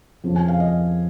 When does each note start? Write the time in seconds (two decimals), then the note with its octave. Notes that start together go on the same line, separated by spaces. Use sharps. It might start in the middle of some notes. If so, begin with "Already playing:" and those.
0.24 F2 C#3 F3
0.36 G#5
0.48 F5
0.60 D#5